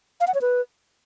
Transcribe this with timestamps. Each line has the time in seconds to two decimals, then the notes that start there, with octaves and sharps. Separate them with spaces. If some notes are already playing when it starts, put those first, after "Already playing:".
0.20 F5
0.27 F#5
0.34 C#5
0.41 B4